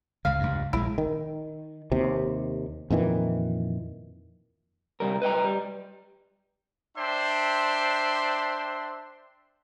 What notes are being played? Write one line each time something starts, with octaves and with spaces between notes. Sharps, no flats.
C#2 C#3 F5
C#2 G2
A#1 D#3 G#3 E4
D#3
D#2 C3
F2 A#2 D#3 E3
C2 G#2 G3 A#4
B4 D#5 G5 A#5
G3
D4 C5 E5 G5 C6